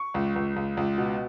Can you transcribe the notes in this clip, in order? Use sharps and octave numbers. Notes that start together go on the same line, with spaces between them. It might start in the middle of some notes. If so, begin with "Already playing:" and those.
Already playing: C#6
C#2
C#2
C#2
C#2
B2